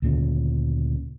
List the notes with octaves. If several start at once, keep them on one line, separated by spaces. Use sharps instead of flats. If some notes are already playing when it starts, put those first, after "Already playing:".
D2 A#2 C#3